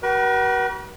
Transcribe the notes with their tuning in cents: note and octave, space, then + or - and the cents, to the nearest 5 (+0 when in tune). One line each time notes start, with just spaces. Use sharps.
F#4 +40 B4 -45 B5 +0